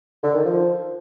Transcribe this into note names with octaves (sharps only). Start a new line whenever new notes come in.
D3
D#3
F3